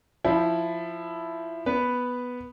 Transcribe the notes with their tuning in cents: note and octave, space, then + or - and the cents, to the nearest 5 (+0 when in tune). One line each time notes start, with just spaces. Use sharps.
F3 +0 E4 +10
B3 +0 B4 +0